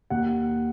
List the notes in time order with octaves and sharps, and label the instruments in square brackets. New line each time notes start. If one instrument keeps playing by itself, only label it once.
[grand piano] D#2 F#5